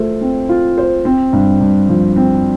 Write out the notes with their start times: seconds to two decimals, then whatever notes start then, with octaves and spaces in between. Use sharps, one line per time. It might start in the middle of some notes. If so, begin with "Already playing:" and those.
Already playing: A3 F4 C5
0.21 C4
0.49 F4
0.78 C5
1.05 C4
1.33 G2
1.61 G2
1.89 F3
2.16 C4